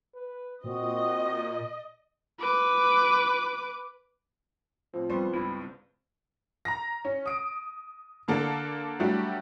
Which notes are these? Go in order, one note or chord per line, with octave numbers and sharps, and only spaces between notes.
B4
A#2 C4 F#4 D#5
B4 D6
A2 F3 C4
G3 B3 C4 B4 C6 C#6
C#2 G2 E4
A#5 A#6
C#4
D#6 D7
D3 A#3 D4 A4
F#3 G3 A3 D4 F#4 G4